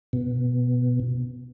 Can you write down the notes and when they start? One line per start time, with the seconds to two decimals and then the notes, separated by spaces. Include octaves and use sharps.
0.13 B2